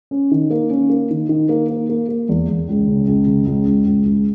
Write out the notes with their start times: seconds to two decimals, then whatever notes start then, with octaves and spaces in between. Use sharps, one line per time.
0.11 C#4
0.31 D#3
0.50 A#3
0.70 C#4
0.90 A#3
1.10 D#3
1.29 D#3
1.49 A#3
1.69 A#3
1.89 A#3
2.09 A#3
2.29 E2
2.49 E2
2.68 C#2
2.88 C#3
3.07 C#2
3.27 C#3
3.46 C#2
3.66 C#2
3.86 C#2
4.06 C#2